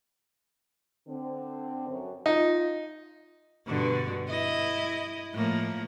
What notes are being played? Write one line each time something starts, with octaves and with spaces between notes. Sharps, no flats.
D3 C4
F#2
D#4 F4
G2 B2 D3
E4 D#5
A2 F3 A#3